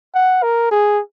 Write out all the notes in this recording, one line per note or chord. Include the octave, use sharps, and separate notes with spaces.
F#5
A#4
G#4